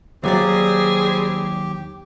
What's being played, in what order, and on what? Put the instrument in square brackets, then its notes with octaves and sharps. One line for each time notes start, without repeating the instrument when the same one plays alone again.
[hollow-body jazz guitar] D#2 F#3 D5 [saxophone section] G3 C4 G#4 [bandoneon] G4